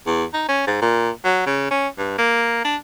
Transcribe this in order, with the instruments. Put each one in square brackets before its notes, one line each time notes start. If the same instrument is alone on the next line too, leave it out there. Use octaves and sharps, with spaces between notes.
[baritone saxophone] E2
D#4
C#4
G#2
A#2
F#3
C#3
C#4
G2
A#3
D4